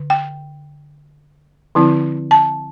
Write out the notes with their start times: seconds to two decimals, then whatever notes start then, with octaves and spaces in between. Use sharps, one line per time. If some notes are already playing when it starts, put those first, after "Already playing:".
Already playing: D3
0.10 G5
1.75 D3 F3 C4 E4
2.31 A5